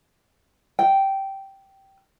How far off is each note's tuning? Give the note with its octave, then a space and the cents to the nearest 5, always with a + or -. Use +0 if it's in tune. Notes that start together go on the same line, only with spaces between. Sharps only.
G5 -10